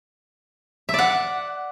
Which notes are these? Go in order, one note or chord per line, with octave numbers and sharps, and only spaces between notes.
D5 E5 F#5